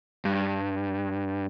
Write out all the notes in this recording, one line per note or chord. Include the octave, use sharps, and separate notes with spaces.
G2